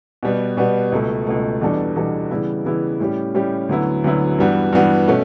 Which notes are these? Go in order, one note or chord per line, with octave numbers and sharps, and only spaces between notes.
B2 G3 B3
B2 G3 B3
C#2 B2 A3
C#2 B2 A3
E2 B2 G3 D4 A4
E2 B2 G3 D4 A4
C#3 E3 G3 B3 E4
C#3 E3 G3 B3 E4
A2 G3 C#4 G4
A2 G3 C#4 G4
D2 D3 F#3 B3 E4
D2 D3 F#3 B3 E4
G2 E3 G3 B3 F#4
G2 E3 G3 B3 F#4
B2 A3 C#4